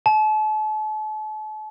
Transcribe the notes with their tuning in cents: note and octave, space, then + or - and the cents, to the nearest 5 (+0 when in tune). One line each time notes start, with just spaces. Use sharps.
A5 -40